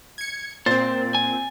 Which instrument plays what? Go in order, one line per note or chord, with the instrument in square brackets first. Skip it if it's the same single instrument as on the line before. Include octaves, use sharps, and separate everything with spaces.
[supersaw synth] G#6 C#7
[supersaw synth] A#2 C4 [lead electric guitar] C5 [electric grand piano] A6
[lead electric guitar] G#5